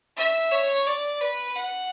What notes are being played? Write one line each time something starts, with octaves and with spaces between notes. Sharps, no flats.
E5
C#5
D5
B4
F#5